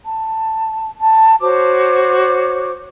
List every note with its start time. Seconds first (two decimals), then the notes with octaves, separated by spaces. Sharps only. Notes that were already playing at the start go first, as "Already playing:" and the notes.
0.05 A5
1.01 A5
1.40 F#4 C5 C#5 D6